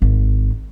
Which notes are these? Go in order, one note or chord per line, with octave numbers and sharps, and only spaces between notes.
G#1